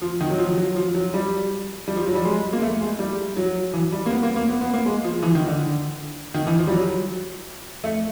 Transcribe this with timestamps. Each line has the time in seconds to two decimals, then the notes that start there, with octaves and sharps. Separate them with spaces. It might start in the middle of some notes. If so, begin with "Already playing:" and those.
0.01 F3
0.21 D#3
0.30 F#3
0.38 F3
0.57 F#3
0.76 F3
0.94 F#3
1.14 G3
1.88 G3
1.96 F3
2.07 F#3
2.15 G3
2.25 G#3
2.53 A#3
2.62 A3
2.81 G#3
2.99 G3
3.37 F#3
3.74 E3
3.92 G3
4.06 A#3
4.11 B3
4.23 A#3
4.36 A#3
4.49 B3
4.61 B3
4.74 A#3
4.86 G#3
5.04 F3
5.23 E3
5.35 D#3
5.47 D3
6.34 D#3
6.47 E3
6.58 F3
6.67 G3
6.72 F#3
7.84 A3